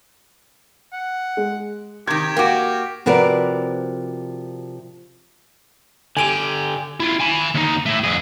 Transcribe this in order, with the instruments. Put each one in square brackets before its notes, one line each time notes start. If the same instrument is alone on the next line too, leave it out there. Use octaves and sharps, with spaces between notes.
[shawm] F#5
[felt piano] G#3
[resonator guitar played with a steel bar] C3 D#3 [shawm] G4 [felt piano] G#6
[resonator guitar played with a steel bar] A#3 F#4 [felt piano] G5 D6
[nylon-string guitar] C3 F3 F#4 A#4 B4 D5
[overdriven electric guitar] D3 G4 [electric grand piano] G#5 D7 D#7
[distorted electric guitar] E4 F4
G#5 B5
D#2 D#4
A3 E4
F2 G#4